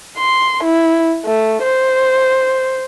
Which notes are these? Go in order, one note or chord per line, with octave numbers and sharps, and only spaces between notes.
C6
E4
A3
C5